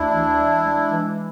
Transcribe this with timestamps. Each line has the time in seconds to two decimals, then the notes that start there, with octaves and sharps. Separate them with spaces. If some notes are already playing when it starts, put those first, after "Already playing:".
Already playing: D2 D4 E4
0.09 E3
0.36 G#3
0.63 G#3
0.89 E3